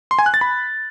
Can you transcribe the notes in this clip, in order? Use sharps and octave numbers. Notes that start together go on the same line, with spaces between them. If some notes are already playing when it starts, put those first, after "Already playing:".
C6
G#5
F#6
A6
B5